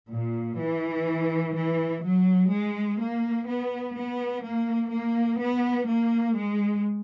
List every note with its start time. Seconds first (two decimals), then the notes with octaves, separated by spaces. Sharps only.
0.11 A#2
0.58 E3
1.56 E3
2.03 F#3
2.51 G#3
3.00 A#3
3.48 B3
3.96 B3
4.43 A#3
4.91 A#3
5.40 B3
5.88 A#3
6.36 G#3